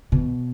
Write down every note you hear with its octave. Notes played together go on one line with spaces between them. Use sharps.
B2